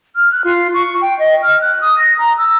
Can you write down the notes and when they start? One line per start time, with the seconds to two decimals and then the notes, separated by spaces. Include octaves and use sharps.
0.16 F6
0.32 F#6
0.44 F4
0.74 C#6
1.02 G5
1.19 D#5
1.43 F6
1.61 F#6
1.81 D#6
1.98 A#6
2.19 A#5
2.38 E6